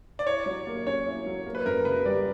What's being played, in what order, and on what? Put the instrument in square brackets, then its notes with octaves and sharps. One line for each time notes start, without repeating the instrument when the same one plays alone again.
[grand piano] D5
[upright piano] E4 [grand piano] C#5
[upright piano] F#3
A#3
[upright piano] C#4 [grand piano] C#5
[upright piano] E4
F#3
A#3
[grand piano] B4
[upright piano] F#2 [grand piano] A#4
[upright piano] C#3 [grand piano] B4
[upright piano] G3 [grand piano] D5